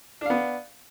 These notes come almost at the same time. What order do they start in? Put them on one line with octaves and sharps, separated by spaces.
D4 F5 B3